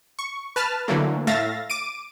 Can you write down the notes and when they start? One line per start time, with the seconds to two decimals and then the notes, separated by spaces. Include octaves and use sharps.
0.19 C#6
0.56 B4 A5 F6
0.88 D3 E3 F#3 A3 A#3
1.27 A2 A3 E5 F5 A6 A#6
1.70 D6 D7 D#7